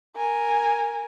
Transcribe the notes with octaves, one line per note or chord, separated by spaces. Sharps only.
A#4 G#5